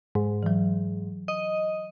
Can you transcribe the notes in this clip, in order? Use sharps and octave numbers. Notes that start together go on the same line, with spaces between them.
G#2
E3 F#3
D#5